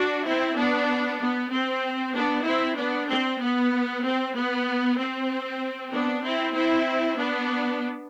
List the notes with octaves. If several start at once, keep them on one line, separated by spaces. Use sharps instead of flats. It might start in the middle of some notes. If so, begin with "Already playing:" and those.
Already playing: D4 F#4
C4 E4
B3 D4
B3
C4
B3 D4
C4 E4
B3 D4
C4
B3
C4
B3
C4
B3 D4
C4 E4
C4 E4
B3 D4